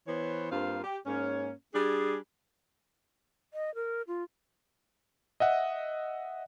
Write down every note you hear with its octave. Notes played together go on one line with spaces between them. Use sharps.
E3 B3 C5 C#5
G2 A#3 C4 F4 F5
G4
G#2 A#3 C#4
G3 D4 G#4
D#5
A#4
F4
D#5 E5 F#5